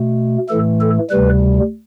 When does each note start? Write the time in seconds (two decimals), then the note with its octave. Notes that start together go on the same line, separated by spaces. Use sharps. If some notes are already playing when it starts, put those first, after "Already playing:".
Already playing: B2 A3
0.49 A2 E3 A3 A4
0.81 A4
1.10 D2 C3 G3 B4